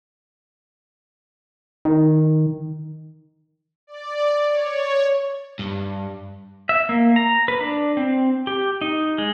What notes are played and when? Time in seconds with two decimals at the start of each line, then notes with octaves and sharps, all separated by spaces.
1.85 D#3
3.87 D5
4.50 C#5
5.59 G2
6.69 E5
6.89 A#3
7.16 A#5
7.48 B4
7.61 D4
7.97 C4
8.47 G4
8.81 D#4
9.18 G#3